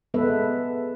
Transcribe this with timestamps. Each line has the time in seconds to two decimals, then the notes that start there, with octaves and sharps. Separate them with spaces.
0.14 G#3 B3 A4 B4 E5